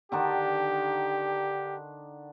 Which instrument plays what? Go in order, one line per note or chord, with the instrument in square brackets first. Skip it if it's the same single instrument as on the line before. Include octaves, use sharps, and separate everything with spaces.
[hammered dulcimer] D3 D#3 D4 [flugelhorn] G4